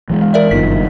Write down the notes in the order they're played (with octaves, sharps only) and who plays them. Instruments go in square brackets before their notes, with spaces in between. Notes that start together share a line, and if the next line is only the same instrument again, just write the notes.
[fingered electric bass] E3 G3 G#3
[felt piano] F5
[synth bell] A#4 D5 E5
[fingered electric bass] F#1 G2 [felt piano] B2 D#3 F3 [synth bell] B6